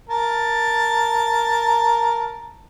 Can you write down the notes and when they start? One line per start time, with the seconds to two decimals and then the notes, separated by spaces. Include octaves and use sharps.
0.09 A#4 A5